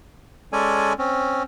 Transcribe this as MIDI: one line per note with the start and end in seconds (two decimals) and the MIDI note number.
0.53 0.93 56
0.53 0.93 61
0.53 0.93 69
0.53 0.93 74
0.53 0.93 80
0.98 1.43 60
0.98 1.43 61